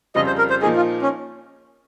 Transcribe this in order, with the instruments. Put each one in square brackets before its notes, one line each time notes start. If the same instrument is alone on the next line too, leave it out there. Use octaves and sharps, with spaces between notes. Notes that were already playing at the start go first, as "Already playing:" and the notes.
[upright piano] F2 C#3 G3 C4 F4 [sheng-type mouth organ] D#5
[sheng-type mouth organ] C5
A#4
C5
[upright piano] A#2 F3 A#3 D#4 [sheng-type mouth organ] G#4
[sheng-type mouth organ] F4
C#4